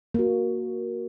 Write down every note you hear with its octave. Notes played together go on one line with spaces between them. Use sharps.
A#3 F#4